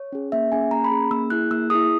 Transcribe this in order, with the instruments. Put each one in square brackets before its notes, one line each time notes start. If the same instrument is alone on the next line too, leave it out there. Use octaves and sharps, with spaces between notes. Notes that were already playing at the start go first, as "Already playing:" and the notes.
Already playing: [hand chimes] C#5
C#4 G#4
A#3 E5
C#4 G#4 G#5
A#3 A#5
B5
C#4 G#4
A#3 E6
E4 G#4 F#6
A#3 E6
E4 G#4 D#6